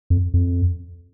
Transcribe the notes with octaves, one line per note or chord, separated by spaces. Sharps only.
F2
F2